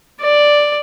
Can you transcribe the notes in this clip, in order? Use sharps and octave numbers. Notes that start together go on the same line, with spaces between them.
D5